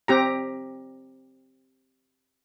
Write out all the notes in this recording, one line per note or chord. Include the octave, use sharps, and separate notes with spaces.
C4 G4 A#5